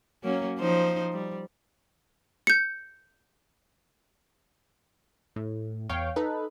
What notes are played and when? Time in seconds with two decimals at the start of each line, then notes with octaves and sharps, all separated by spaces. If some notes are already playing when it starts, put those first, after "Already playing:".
0.23 F#3 A#3 C#4
0.59 F3 D#4 C5
1.13 G3
2.47 G6 C#7
5.36 A2
5.89 E2 C#5 F5 G5
6.16 D#4 A4 B4